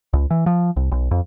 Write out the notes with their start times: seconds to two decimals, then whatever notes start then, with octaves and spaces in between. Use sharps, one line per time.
0.13 C#2
0.31 E3
0.46 F3
0.76 C2
0.92 B1
1.11 F2